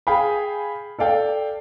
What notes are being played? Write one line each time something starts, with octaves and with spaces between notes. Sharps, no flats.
G#4 F5 G5 G#5 B5
A4 D5 F5 G5